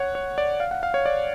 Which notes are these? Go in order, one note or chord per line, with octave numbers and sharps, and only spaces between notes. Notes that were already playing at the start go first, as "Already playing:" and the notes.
Already playing: C#5 F#5
C#5
D5
F5
F#5
F5
C#5
D5